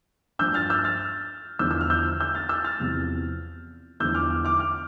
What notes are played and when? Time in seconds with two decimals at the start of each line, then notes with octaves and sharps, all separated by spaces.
0.39 G2 F3 E6 G6
0.54 F6 A6
0.70 E6 G6
0.84 F6 A6
1.59 E2 D3 F3 E6 G6
1.71 E6
1.81 F6
1.90 E6 G6
2.20 E6 G6
2.35 F6 A6
2.49 E6 G6
2.65 F6 A6
2.80 E2 C3 F3
4.00 E2 D3 F3 E6 G6
4.15 D6 F6
4.30 D6 F6
4.45 D6 F6
4.59 D6 F6